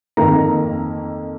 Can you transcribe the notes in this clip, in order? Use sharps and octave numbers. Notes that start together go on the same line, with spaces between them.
F2 D#3 A#3 A#5